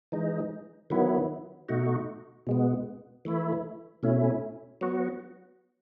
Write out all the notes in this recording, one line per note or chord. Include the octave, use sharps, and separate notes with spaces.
E3 G#3 D#4
D#3 F#3 B3 E4
B2 A3 D#4 F#4
B2 G#3 B3
E3 A3 E4
B2 A3 C#4 E4
F#3 B3 F#4